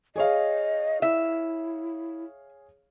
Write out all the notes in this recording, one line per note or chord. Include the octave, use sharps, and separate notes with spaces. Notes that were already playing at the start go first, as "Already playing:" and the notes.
G#4 C#5 D#5 F5
E4 E5